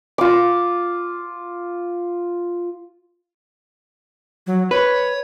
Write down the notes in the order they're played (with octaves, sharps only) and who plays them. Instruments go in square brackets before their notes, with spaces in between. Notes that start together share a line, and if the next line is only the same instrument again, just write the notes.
[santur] F4 D6
[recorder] F#3
[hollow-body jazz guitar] B4 [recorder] C#5